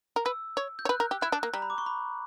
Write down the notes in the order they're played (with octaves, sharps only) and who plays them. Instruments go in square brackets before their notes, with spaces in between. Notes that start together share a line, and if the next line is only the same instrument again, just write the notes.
[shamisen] A#4
[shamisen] B4 [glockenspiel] E6
[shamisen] C#5
[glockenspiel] G6
[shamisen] C#5
[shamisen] B4 [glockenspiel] F#6
[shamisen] A#4
G4
[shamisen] E4 [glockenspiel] F#6
[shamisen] D4
A#3
[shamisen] G3 [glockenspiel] A#5
[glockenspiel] B5
D6
C#6
B5